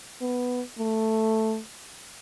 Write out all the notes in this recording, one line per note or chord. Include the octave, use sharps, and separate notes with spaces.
B3
A3